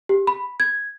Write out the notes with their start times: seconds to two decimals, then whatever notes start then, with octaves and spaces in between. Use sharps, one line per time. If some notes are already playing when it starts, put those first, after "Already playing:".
0.09 G4
0.27 B5
0.60 G#6